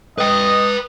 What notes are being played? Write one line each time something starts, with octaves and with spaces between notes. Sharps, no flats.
B4 D#5 G5 D#6